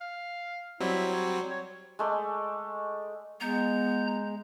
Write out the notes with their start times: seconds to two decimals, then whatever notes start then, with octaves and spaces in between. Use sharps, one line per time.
0.01 F5
0.80 F#3 G3 C4 E4
1.13 C#5
1.51 C#5
1.99 G#3 A3 D5
3.41 G#3 B3 A#5 G6